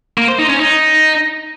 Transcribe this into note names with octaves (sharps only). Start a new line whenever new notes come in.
A#3
C5
D#4
C#4
D#4